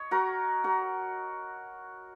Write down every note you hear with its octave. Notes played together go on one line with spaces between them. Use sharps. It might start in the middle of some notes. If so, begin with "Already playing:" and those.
Already playing: C#5 D#5
F#4 A#4
F#4 A#4